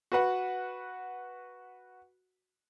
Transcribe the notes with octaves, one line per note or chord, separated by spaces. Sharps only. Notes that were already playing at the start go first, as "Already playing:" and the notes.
F#4 B4 F#5